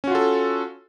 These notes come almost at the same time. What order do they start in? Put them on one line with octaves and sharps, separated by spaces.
C#4 F#4 F4 A4